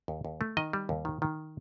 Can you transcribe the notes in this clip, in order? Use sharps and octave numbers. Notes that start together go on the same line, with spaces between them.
D#2
D#2
A3
D#3 D#5
G3
D#2
D#3
D#3